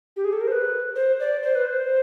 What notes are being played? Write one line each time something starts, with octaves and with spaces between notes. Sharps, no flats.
G4
G#4
A4
A#4
C5
B4
C5
D5
C5
B4
C5